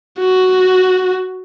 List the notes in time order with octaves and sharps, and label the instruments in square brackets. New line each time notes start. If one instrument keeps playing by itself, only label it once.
[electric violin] F#4